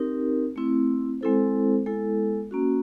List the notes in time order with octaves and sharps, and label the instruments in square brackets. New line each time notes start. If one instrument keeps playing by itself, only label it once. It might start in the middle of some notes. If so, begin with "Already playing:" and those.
Already playing: [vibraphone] C4 D#4 G4 A#4
A3 C4 E4
G#3 C4 E4 A4 C5
G#3 B3 E4 A4
A#3 C#4 F#4